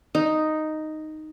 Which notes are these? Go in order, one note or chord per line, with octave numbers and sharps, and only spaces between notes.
D#4